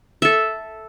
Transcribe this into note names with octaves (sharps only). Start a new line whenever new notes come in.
A4 E5